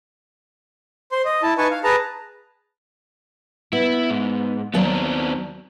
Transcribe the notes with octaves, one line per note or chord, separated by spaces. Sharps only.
C5 C6
D#5
E4 A5
D#4 B4 G#5 A5 C#6
F5
G#4 B4 A5 A#5
B3 E4
G#2
D#2 F#3 B3 C4 D5 A5